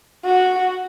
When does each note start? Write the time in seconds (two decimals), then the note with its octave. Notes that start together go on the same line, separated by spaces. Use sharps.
0.24 F#4